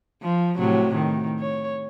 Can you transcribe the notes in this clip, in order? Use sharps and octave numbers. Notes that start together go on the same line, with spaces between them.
F3
A2 C3 F#3
D#3
C#5